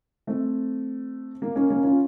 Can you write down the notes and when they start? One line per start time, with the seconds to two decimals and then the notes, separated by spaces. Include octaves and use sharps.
0.27 A3 C4
1.42 A#3
1.56 A#3 C#4
1.70 A#3 C#4
1.83 C#4 F4